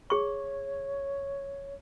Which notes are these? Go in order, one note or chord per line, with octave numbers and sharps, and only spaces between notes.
G#4 C#5 C#6